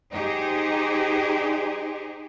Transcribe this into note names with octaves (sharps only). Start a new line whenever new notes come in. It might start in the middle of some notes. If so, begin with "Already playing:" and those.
D#4 G4 G#4 C5